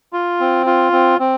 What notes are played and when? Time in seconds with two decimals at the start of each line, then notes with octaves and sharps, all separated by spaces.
0.13 F4
0.40 C4
0.66 F4
0.92 C4
1.19 C4